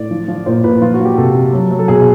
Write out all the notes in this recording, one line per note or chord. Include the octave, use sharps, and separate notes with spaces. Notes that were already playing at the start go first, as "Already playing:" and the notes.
Already playing: A2 D5
F3
F3
A#2 C5
A#2 B4
F3 F4
F#4
F3
G4
C3 A4
C3
F#3
F#3
A4
B2 G#4